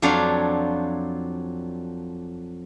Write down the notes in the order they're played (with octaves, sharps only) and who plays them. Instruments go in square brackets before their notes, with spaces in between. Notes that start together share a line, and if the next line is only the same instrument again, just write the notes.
[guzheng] F2 F3 F#3 D4 F4 F5